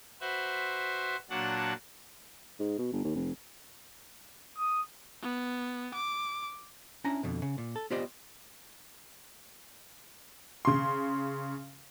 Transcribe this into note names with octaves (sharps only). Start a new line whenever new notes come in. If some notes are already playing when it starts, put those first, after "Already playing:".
F#4 B4 C5 E5
A#2 F#3 D4 F#4 F#5 A5
G#2
B2
G1
D#2
F1
D#6
B3
D6
C#4 D4 E4 A#5
F2 B2 D3
C#3
A#2
A4
B3 F4 G4 C5 D5 D#5
C#3 C6